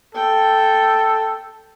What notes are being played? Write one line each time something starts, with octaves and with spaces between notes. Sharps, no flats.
A4 G5